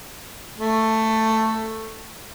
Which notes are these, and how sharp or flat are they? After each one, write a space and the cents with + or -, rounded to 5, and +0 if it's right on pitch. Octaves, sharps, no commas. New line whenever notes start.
A3 +10